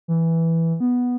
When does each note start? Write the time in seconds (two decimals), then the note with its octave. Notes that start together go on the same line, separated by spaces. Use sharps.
0.08 E3
0.80 B3